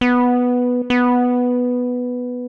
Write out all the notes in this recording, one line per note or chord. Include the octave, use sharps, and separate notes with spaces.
B3
B3